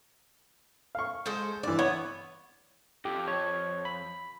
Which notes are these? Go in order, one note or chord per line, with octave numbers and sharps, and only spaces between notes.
F5 C#6
G#3 A4 C5
G2 E3 D5
B3 C#5
F2 G4
C#5
B5